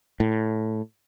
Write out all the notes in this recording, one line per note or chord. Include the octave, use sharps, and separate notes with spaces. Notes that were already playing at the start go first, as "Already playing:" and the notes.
A2